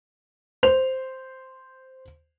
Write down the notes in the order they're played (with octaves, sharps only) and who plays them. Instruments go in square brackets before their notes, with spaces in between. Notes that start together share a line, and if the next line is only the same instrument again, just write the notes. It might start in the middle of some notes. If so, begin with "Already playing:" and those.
[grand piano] C5 F7